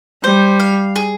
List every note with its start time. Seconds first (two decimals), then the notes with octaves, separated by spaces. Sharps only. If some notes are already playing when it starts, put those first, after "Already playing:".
0.24 G3 C5
0.60 F5
0.96 G#4